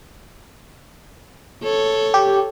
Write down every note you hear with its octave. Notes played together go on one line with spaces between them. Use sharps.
A4 C#5
G4